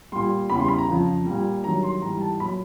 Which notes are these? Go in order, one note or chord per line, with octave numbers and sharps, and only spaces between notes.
A#2 G3 C6
E2 C#3 E3 G3 B5
C6
B5
A#5
F2 C#3 F3
A#2 G3
G2 D#3 F#3 A#5
C6
G#2 E3 G3 A#5
A5
A#2 F#3 B5